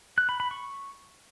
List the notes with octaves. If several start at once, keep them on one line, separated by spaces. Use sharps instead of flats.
F#6
B5
B5
C#6